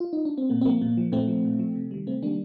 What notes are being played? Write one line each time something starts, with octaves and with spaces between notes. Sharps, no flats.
F4
D#4
D4
C4
A#2 A#3
C4
F3 A#3
A#2 A#3
F3
A#2 A3 C4
F3
A#2
F3
C3
D#3 G3
C3 A3 C4
D#3 G3 A#3 D4